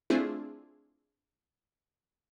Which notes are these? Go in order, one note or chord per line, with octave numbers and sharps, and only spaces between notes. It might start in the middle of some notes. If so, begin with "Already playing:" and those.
A3 C4 D4 E4 F4 G#4